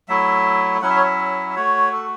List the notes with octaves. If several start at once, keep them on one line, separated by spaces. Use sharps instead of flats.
F#3 A3 E4 E5
F#3 C#4 E4 F#5
E5
C#5
E5
E5
A3 F#4 C#5
A4